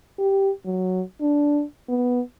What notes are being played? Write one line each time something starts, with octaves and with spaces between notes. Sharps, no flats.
G4
F#3
D4
B3